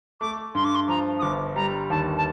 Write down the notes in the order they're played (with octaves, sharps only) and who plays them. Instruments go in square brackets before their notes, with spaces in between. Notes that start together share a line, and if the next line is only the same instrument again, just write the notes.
[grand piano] A3 [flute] D6
[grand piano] G2 [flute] C6
[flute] D6
C6
[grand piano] F3 [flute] A#5
[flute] D#6
[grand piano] G1 [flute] D6
[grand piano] G3 [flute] A#5
[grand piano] D#2 [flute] A5
[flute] A5